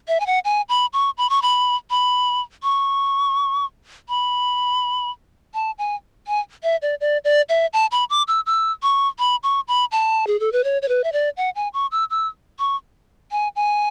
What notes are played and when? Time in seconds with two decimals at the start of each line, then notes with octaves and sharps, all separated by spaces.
0.08 E5
0.20 G#5
0.26 F#5
0.45 G#5
0.69 B5
0.93 C#6
1.18 B5
1.30 C#6
1.42 B5
1.90 B5
2.63 C#6
4.09 B5
5.54 A5
5.78 G#5
6.27 G#5
6.63 E5
6.82 D5
7.01 D5
7.25 D5
7.49 E5
7.73 A5
7.92 B5
8.10 D6
8.28 E6
8.46 E6
8.83 C#6
9.19 B5
9.43 C#6
9.68 B5
9.92 A5
10.27 G#4
10.40 A4
10.52 B4
10.64 C#5
10.82 C#5
10.89 B4
11.04 E5
11.13 D5
11.37 F#5
11.55 G#5
11.74 C#6
11.92 E6
12.10 E6
12.59 C#6
13.31 G#5
13.56 G#5